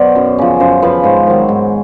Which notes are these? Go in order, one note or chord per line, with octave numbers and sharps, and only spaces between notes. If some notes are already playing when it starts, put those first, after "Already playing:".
Already playing: B2 F#3 C5 D5
F#2
C#3 F3
F#2 C5
C#3 F3 B4
G#2 C5
D#3 F#3
G#2